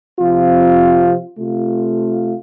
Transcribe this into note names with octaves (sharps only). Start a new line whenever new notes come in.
C3 F3 C4 F4
C3 A3 F4